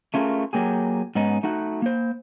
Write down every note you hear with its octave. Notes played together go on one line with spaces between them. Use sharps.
A3 C#4 F4 G#4 A#4
F#3 A#3 G4 G#4
G#2 B3 C#4 D#4
A3 D#4 F#4 F#5
A#3 C5